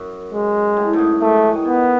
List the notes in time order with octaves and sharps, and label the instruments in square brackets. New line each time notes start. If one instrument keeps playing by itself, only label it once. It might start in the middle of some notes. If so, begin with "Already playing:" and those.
Already playing: [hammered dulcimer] F#2
[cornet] G#3
[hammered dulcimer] A2
G#2
F#2
[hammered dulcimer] G#2 [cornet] A3
[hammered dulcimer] F#3
E3
D#3
[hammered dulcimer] B2 [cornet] B3